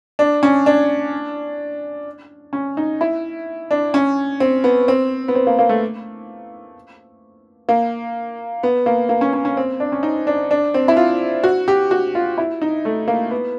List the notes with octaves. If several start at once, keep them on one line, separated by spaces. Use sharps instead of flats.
D4
C#4
D4
C#4
D#4
E4
D4
C#4
C4
B3
C4
B3
C4
A#3
A#3
A3
A#3
B3
A#3
A#3
C#4
C#4
C#4
C4
D4
C#4
D#4
D4
D4
C4
E4
F4
F#4
G4
F#4
F4
E4
D#4
A3
A#3
B3